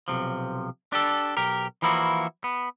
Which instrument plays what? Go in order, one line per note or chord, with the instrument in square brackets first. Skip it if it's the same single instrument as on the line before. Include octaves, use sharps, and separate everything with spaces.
[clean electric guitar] B1 C3 F3
D4 G4 A4
B1 G4 A#4
E3 F3 A#3 E4 F#4
B3